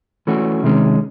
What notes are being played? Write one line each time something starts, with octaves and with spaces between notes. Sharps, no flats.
E3 A3 C#4 F#4
C3 D#3 G#3 C#4